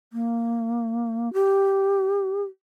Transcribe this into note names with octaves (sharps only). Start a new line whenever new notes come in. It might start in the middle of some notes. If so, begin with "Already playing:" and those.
A#3
G4